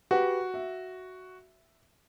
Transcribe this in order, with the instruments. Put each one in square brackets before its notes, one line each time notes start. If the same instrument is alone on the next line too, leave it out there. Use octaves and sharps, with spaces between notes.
[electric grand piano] F#4 [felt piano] G4 B4 F#5
[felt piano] E5